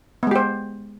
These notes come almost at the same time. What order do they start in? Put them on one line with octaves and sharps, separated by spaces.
B3 G#3 G4 C5